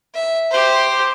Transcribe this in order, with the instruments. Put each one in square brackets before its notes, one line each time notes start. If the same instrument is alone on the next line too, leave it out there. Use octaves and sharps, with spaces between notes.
[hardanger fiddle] E5
G4 C5